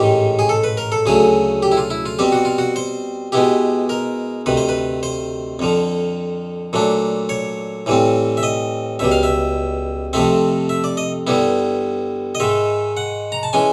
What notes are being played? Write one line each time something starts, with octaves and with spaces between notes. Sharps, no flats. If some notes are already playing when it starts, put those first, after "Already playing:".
Already playing: A1 G#2 D#3 G4
G#4
A4
B4
A#4
A4
D2 C#3 F#3 A3 G#4
G4
E4
F4
E4
F4
B2 G3 C4 G4
F#4
F4
F#4
C5
B2 G#3 B3 E4 G4
A#4
D2 C3 D#3 B4
C5
B4
C5
F2 D3 F3
A#2 F#3 A3 D4
C#5
A2 E3 G3 C4
E5
D#5
C#2 B2 G3 E5
F5
E5
F2 C3 F3 A3 C4 E5
E5
D5
D#5
G2 D3 G3 B3 E4
D#5
G#2 D#3 G#3 E5
F#5
A#5
A5
E3 G#3 C#4 G#5